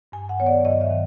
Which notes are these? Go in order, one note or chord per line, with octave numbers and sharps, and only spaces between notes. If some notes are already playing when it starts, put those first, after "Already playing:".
G2 G#5
F#5
D#3 F#3 B3 C#5
D5
G2 D#5
E5
D#3